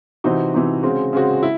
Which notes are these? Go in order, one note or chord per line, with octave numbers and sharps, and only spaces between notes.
C3 E3 C4 D#4 F#4
C3 E3 C4 D#4 F#4
C#3 G#3 C4 F#4
C#3 G#3 C4 F#4
E4